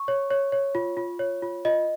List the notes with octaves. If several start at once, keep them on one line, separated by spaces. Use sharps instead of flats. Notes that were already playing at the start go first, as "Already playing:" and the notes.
Already playing: C#6
C#5
C#5
C#5
F4
F4
C#5
F4
F4 D#5